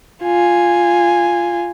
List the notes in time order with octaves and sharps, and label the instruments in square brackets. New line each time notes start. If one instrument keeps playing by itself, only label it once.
[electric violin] F4 G#5